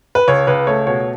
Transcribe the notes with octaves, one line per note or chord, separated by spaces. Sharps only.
B4
C#2 C#5
C#2 B4
A3 C#5
B2 C#5